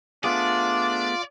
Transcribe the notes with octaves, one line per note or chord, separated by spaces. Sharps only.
A3 B3 D4 F4 G#4 D5